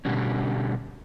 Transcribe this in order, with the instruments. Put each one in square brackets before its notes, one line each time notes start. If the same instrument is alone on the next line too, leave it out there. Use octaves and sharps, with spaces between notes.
[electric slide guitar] B2 D3 G3 C#4